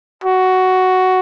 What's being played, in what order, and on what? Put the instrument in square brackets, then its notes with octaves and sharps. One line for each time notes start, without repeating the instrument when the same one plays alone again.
[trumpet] F#4